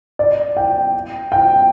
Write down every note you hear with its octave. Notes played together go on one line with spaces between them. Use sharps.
D5
G5
G5